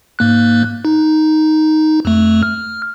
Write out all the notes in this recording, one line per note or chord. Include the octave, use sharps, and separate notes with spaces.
G#2 A#3 F#6
D#4
F2 A3
F6